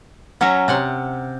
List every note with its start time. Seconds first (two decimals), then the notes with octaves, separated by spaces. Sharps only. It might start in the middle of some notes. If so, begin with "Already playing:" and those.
0.41 F#3 C#4 C#5 E5 A#5
0.68 C3 F#5 C6